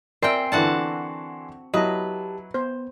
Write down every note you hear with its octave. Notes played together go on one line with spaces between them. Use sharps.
C4 A#4 D5 E5 G5 G#5 C6 C7
D3 E3 D4 F#4 F#5 A5
F#3 E4 G4 B4 D#5 A5
B3 C5